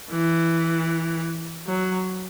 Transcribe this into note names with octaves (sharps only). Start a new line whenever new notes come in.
E3
F#3